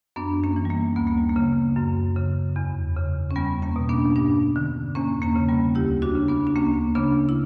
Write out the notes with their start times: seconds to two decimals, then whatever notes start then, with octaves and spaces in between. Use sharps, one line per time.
0.16 F#2 B3 D4
0.44 A#3 C#4
0.56 E3
0.65 G3
0.70 A#3
0.96 D2 B3
1.07 A#3
1.18 G3
1.29 A#3
1.36 C#3
1.76 F#2
2.17 C#3
2.56 E2
2.96 C#3
3.31 C#4
3.36 E2 G3 B3
3.62 A#3 C#4
3.76 B2
3.89 B3 D4
4.16 G2 B3 D4
4.56 D3
4.95 E2 A#3 C#4
5.22 A#3 C#4
5.36 C#3
5.49 G3 B3
5.75 D2 E4 G4
6.02 D4 F#4
6.15 C#3
6.28 B3 D4
6.47 D4
6.56 D2 A#3 C#4
6.95 C#3 B3 D4
7.29 E4